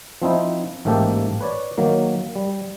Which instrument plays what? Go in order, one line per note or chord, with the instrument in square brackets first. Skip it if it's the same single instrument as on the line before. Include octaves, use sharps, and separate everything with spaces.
[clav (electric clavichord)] F3 C4 D#4 E4
A1 G#2 A3 A#3 G4 A4
B4 C#5 D5
D#3 F#3 A#3
G3